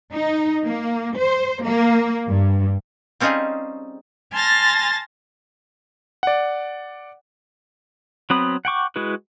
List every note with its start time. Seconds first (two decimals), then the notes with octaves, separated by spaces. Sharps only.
0.13 D#4
0.65 A#3
1.17 C5
1.63 A#3
2.29 G2
3.20 G3 C4 C#4 D#4 F4 G#4
4.32 G#5 A5 C6 F6 A6 A#6
6.23 D5 F#5
8.30 F#3 B3 C4 B5 D#6
8.65 F#5 G5 C#6 D6
8.96 G#3 E4 F#4 B4